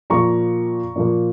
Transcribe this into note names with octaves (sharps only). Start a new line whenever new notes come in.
A#2 F3 A#3 A#5 C#6
A#2 F3 A#3